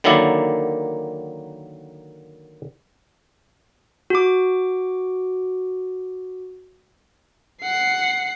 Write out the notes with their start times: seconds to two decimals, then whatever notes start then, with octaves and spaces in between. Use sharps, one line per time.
0.04 D3 D#3 F#3 A#3 E4 D5
4.10 F#4 D6
7.62 F#5 C7